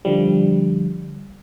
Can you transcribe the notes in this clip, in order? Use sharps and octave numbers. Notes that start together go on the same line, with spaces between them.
D3 F3 G3